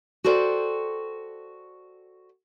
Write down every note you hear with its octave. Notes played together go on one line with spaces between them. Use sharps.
F#4 A4 C5 D5 G5